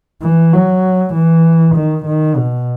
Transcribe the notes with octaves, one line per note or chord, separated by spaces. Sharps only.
E3
F#3
E3
D#3
D#3
B2